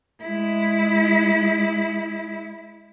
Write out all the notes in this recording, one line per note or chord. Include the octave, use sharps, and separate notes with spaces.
G#3 E4